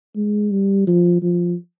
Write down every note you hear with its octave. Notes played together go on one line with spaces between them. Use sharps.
G#3
G3
F3
F3